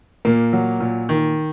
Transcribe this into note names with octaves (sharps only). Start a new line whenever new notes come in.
A#2 A#3
F#3
A#2
D#3